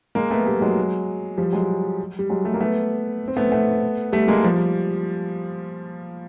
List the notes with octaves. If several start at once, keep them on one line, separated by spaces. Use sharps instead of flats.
G#3 A#3
A3 B3
G3 A3
F#3 G#3
F3 G3
F#3 G#3
G3
F#3 G#3
G3 A3
A#3
A3 B3
C4
A3 B3
A3 B3
G3 A3
G#3 A#3
F3 G3